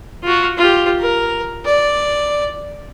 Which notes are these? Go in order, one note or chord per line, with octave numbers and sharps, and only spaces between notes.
F4 F#4
F4 G4
A#4
D5